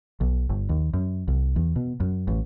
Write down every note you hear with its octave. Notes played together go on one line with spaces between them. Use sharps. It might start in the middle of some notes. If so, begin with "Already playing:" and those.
B1
G1
D#2
F#2
C2
E2
B2
F#2
A1